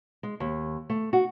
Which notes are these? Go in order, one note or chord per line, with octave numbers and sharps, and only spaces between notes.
G#3
D#2
A3
F#4